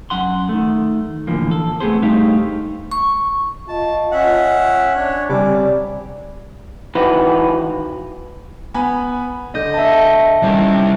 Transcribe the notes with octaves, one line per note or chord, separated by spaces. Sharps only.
F#2 F#5 C6
D#3 A3
A2 D3 E3 F3 A#3
A4
A3 B3 C4 G#4 C5
G2 A3 D#4 G4 C5 F5
C#6
F4 D#5 A5
C#4 E5 F#5
D4 C#5
C3 G3 D5 G#5 D6
D#3 E3 F#4 B4
B3 G#5 B5
D3 D#5 G6
E5 A5
D#3 G3 C#4 E4